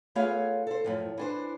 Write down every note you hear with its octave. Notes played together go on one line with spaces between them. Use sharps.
A3 B3 F4 G#4 C#5 F5
A4 C5
F#2 A2 F3
E3 D4 C5